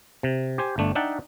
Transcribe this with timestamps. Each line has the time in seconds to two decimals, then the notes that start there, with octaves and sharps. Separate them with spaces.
0.23 C3
0.58 G4 C5 G#5
0.78 G1 A3 D4
0.95 D4 D#4 E5 F#5 G5 A5